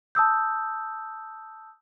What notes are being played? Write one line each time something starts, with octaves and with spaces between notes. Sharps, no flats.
A5 D#6 E6 G6